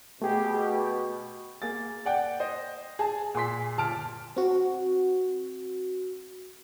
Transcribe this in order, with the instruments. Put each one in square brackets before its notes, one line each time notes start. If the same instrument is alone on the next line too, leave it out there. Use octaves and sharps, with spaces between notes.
[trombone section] B2 [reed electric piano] A3 G#4 [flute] G4
[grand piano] A#3 G#4 A6
D5 F#5 G5
C5 D#5
G#4 G#5 A5
A#2 G#4 C6 B6
G1 A5 F6 D7
[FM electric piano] C4 F#4